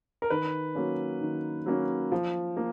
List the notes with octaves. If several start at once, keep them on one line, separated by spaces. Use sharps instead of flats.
A#4
D#3 B4
F#3 A#3 C#4
D#3
F#3 A#3 C#4
F3
A#3